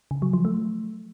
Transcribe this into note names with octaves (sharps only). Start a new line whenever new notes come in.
C#3
F#3
F3
A3